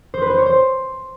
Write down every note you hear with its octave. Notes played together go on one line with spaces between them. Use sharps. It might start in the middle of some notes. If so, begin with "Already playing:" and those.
C5
B4
C5
C#5
C5